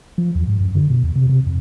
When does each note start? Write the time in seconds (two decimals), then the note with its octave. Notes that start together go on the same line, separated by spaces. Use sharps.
0.18 F3
0.35 E2
0.48 G#2
0.60 F#2
0.75 D3
0.90 B2
1.03 E2
1.16 C3
1.29 C3
1.46 F2